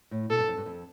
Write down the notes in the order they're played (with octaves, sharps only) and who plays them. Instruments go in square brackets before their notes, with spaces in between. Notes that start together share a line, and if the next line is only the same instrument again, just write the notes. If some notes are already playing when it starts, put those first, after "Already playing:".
[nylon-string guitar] A2
[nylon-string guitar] B2 [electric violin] A4
[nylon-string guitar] G2
F2
G2
F2